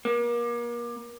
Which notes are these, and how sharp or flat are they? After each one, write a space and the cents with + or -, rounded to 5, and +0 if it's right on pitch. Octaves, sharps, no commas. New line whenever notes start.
A#3 +35